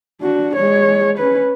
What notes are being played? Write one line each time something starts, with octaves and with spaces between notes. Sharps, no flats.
D4 F#4
G#3 C#5
C#4 B4